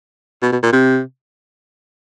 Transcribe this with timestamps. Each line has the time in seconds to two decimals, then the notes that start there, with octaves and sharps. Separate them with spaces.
0.42 B2
0.52 B2
0.62 A#2
0.72 C3